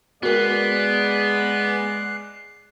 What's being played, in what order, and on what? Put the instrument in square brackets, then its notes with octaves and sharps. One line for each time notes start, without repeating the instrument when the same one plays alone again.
[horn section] G#3 D5 [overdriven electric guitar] B3 [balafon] F#4 A#4 [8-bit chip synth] F#6 C7